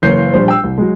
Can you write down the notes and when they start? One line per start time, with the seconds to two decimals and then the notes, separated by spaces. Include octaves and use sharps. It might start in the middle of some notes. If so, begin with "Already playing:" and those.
0.02 F#1 E3 A#3 C#5 G6 C7
0.34 A#1 G3 D4 C5
0.48 G5 E6
0.63 C2
0.78 F#3 G#3